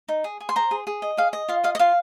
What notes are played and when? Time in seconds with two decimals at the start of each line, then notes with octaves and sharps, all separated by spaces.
0.09 D#4
0.24 G#4
0.40 G#4
0.49 C6
0.56 C5 A#5
0.71 G#4
0.87 G#4
1.02 D#5
1.17 G#4 F5
1.33 D#5
1.49 F4 F5
1.64 D#5 F5
1.75 D#5
1.79 F4 F5